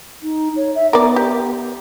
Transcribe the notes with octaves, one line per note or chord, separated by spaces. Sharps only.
D#4
C#5
E5
B3 A#4 D5
G4